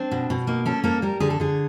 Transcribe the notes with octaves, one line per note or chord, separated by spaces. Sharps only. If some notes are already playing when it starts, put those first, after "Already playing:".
Already playing: C4 D4
B2
B2
A#3 D#4
C#4 A4
A#3 A4
G3 A#4
D3 G#4
A4
D3 G#4